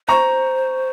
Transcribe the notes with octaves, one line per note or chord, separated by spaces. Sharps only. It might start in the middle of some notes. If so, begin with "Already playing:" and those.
C5 A#5 C#6